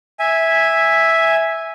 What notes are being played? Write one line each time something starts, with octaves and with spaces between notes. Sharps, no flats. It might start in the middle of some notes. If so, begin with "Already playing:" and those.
E5 G#5